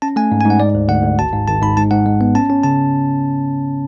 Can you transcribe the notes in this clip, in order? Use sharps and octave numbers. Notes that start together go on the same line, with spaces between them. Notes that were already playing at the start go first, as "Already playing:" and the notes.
C#4 A5
A3 G#5
G#2
G#5
G#2 F#5
G#3 D5
D2
D2 F#5
D2
G#1 A5
G#2
G#1 A5
G#2 B5
G#2 A5
G#2 F#5
G#3
B3
C#4 A5
C#4
C#3 A5